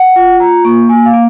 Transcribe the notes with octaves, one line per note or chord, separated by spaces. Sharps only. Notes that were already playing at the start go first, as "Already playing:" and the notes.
Already playing: F#5
F4
F4 A#5
A#3 C#6
A#3 G#5
F5
A#3